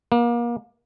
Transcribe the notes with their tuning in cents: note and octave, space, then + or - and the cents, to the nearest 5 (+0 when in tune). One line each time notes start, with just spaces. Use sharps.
A#3 +30